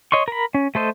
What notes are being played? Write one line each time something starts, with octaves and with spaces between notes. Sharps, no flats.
C#5 D#5 C6 C#6
A#4 B5
C#4
A3 A4 C5 D#5